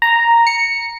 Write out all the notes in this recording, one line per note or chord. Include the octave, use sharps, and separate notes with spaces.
A#5
C#7